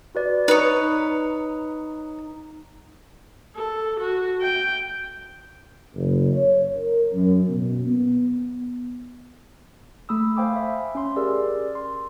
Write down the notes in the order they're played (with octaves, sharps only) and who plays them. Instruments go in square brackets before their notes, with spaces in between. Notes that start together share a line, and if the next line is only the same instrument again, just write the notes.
[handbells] F#4 B4 D5
[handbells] D#4 A#5 D#6 [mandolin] B4 C#5
[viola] A4
F#4
G5
[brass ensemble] F#1
C#5
A#4
F#2
B2
B3
[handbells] A3 B5 D#6 E6
C5 F5 G5 G#5 B5 D6
E5
C#4 C6
G4 G#4 A#4 D5 E6
C6